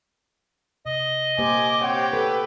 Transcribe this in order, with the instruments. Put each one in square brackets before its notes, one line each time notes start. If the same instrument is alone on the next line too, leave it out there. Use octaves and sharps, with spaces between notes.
[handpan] C3 [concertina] D#5
[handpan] A#3 G4 C5 [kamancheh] G#5 D6
[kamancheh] C4 [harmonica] G4 G5 [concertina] C#5 [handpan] F#5
[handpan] A4 [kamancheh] B4